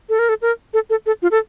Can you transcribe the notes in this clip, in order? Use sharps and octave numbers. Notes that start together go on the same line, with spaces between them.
A4
A#4
A4
A#4
A4
A4
A4
F4
A4